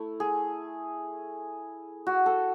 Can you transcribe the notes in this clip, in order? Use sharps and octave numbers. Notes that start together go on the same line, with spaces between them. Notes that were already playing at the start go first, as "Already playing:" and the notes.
Already playing: A3 E4
G#4
F#4
A4